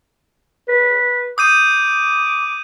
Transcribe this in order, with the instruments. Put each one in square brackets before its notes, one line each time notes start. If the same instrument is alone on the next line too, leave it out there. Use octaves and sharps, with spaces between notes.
[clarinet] B4
[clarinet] D6 [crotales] D#6 G6 D#7